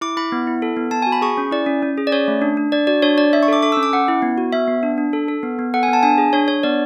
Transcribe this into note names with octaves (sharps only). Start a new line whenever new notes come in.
E4 D6
E4 B5
B3
E4
A4
B3
B3 A5
G#5
F#4
B5
G#4 C#6
C#4
E4 D5
C#4
C#4
G#4
D5
C#4 C#5
A3
D4
D4
D4 D5
F#4 D5
D4 C#5
D4 D5
D4 E5
C#6
A4 D6
A4 D6
E6
C#4
D6
C#4 F#5
E4
B3
F#4
B3 E5
B3
D4
D4
A4
A4
B3
B3
A4 F#5
G#5
B3 A5
D4 G#5
G#4
D4 C#5
D4 C#5
B3 D5